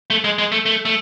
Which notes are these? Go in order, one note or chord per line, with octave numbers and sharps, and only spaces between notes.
A3
G#3
G#3
A3
A3
A3